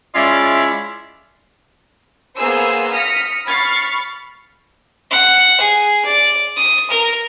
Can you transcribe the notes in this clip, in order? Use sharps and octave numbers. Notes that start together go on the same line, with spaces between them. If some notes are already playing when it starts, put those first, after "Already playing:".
G#3 C#4 E4 F4 D5 E5
A#3 B3 G#4 C5 E6
D#6 F6 A#6 B6 C#7
B5 C#6 F6 A6 C7
F#5
G#4
D5
D#6
A#4